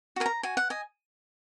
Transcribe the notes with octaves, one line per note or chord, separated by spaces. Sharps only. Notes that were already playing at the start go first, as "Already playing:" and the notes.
F#4 A#4 G#5
A#5
F#4 G#5
F#5
D#5 G#5